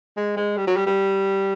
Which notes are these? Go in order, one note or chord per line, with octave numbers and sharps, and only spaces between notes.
G#3
G#3
G3
F#3
G3
G3